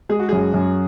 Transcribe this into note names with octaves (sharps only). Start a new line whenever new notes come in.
G#3 G#4
F#4
F#2 G#4
F#2